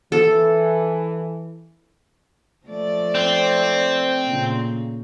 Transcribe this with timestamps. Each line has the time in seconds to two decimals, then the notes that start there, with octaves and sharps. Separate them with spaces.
0.12 E3 A4
2.67 F3 A3 D5
3.15 C4
4.24 A#2 C#3